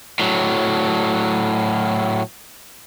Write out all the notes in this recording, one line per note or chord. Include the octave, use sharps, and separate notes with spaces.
A2 F#3